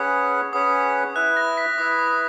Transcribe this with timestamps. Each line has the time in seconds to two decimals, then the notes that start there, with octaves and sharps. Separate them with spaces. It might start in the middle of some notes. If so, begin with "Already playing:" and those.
Already playing: C#4 G#4 B4 F#5 D#6
0.53 C#4 G#4 B4 F#5 D#6
1.16 E4 B4 E5 F#6
1.37 A#6
1.57 B6
1.78 E4 B4 E5 D#6
1.99 D#6